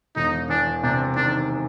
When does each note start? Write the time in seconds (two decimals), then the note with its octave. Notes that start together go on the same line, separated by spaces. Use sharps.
0.16 E1 D#4
0.49 E2 D4
0.83 C3 D4
1.16 D#3 D4